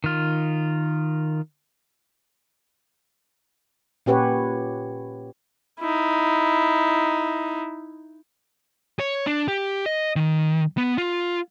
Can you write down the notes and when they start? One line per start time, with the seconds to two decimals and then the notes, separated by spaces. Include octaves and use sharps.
0.04 D#3 F4
4.06 A#2 C#4 G4 B4 C#5 F#5
5.80 D#4 E4
9.00 C#5
9.27 D4
9.48 G4
9.86 D#5
10.16 D#3
10.77 B3
10.98 F4